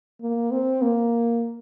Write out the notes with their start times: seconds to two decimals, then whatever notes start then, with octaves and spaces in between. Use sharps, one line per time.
0.22 A#3
0.52 C4
0.82 A#3